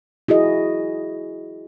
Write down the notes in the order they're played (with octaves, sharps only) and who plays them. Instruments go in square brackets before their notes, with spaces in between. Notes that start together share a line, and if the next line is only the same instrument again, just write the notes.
[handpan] E4 F#4 G#4 D#5